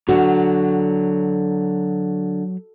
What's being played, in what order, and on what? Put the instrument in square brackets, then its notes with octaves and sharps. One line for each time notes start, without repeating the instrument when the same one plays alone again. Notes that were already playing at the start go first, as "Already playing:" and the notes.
[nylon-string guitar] D3 [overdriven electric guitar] F#3 [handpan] F#4